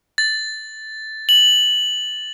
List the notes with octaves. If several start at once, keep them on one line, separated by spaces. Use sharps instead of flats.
A6
F#7